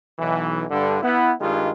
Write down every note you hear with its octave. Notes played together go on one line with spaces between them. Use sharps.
B1 E3
G2 D3
B3 E4
G2 D#3 G3 G#3 F4